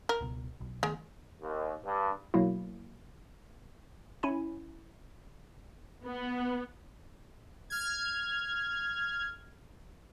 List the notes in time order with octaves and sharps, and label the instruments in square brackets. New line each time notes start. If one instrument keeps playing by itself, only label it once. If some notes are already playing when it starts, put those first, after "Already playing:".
[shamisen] A#4
[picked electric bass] C#2 B2
B1
[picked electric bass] D#3 A3 B3 [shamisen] G#3
[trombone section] D#2
G2
[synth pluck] B2 F#3 A#3 E4
C#4 E4 G#5
[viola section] B3
[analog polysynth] F6 G#6